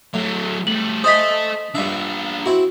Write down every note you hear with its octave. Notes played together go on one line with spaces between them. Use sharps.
A2 F#3 A3
G3 A3 F#7
A4 C5 D#5 E5 G#5 D#6 B6
G2 D4 F4 E5
C4 E4 F#4